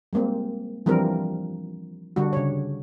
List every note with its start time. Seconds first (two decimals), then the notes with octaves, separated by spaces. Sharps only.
0.13 G3 G#3 A#3 C4
0.86 E3 F3 G3 C4 D4 A#4
2.16 D3 G3 D4 F#4
2.33 C#3 C#5